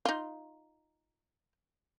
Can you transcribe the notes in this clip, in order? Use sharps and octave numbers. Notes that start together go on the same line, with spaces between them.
D#4 F4